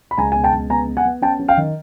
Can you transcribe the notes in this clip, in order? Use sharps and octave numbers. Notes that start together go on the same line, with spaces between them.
B5
C#2 G#5 A#5
B2 G#5
G5 A5
C#2
B3 G#5 A#5
B3
F#5 G#5
B3
C#4 G5 A5
C#4
F5 G5
D#3